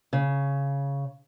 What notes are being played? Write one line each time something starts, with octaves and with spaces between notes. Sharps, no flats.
C#3